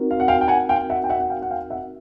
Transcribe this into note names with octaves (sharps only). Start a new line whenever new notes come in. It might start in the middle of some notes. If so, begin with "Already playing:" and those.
Already playing: C4 D#4 F#4 A#4
F5
F#5
F5 G5
G5
F#5 G#5
F5 G5
E5 F#5
G5
E5 F#5
F#5
F5 G5
F#5
F5 G5
E5 F#5